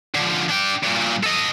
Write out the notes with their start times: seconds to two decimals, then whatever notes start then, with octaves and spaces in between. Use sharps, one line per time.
0.15 D3 F3
0.49 D4 G5
0.83 G2 A#2
1.24 A4 D#5